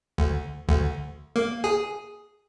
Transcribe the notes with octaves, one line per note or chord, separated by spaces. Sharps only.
D2
D2
A#3
G#4